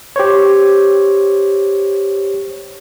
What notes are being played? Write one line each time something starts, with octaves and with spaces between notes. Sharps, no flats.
G4 C5 C#5